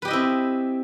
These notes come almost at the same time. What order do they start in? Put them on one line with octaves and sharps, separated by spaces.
B4 G4 D#5 E4 C4